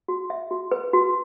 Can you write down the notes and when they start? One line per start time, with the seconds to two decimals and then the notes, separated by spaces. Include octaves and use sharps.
0.08 F#4
0.30 E5
0.51 F#4
0.71 B4
0.93 F#4